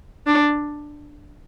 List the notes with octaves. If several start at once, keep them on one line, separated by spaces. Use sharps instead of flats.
D4